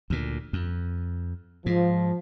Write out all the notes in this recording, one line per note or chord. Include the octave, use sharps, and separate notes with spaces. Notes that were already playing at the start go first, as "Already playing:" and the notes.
D2 A#2
F2
G#2 F3